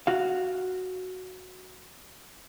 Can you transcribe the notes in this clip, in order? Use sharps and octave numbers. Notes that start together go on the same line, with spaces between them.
F#4 F5